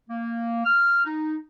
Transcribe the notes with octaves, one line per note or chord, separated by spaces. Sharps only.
A#3
F6
D#4